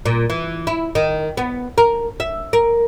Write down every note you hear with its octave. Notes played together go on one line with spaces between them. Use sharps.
A#2
E3
E4
D#3
B3
A#4
E5
A#4